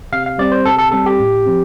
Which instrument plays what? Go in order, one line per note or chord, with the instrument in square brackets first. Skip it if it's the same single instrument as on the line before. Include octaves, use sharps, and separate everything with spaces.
[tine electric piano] C3 F5
F5
G3 C4 D5
C5
C3 A4
A4
G3 C4 A4
G4
A2
F3 C4